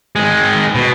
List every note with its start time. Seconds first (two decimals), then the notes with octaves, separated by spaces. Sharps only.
0.16 D#3 G#3
0.75 B2